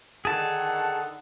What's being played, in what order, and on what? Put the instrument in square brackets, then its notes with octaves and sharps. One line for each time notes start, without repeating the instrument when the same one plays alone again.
[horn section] D3 D#3 F#5 [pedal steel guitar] G#4 A5